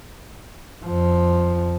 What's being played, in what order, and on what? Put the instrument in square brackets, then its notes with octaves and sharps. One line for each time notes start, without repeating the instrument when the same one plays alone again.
[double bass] F2 F3